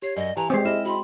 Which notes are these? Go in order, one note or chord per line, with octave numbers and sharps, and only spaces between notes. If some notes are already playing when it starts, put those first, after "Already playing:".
G4 C#5 C7
F#2 D5 D#5
E3 G4 A5 A#5
G#3 C4 G4 B4 D5 C7
E4 D#5 E5 F6 E7
F#4 G5 B5 C6